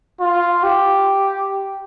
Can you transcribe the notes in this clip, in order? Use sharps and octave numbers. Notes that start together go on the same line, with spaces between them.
F4
G4